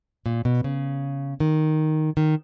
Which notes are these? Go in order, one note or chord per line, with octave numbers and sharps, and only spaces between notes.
A#2
B2
C#3
D#3
D#3